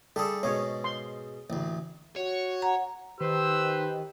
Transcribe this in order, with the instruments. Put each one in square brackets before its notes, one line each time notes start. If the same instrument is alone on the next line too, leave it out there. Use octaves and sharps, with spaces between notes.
[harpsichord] G3 D4 G#4 [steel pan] A4
[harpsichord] G#2 B2 G#3 [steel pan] C#5
[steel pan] C6
[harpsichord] A1 D2
[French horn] F#4 [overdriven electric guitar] C#5
[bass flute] F#5 [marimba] A#5
[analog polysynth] D#3 [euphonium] G4 [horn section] B4 C5 [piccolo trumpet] E6